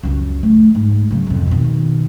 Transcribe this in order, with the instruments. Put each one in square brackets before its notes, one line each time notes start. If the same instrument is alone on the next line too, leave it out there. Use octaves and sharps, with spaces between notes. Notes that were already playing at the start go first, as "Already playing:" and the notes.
[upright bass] C#2 F#2
A3
G#2
C#3 F#3
C2 F2
B2 D#3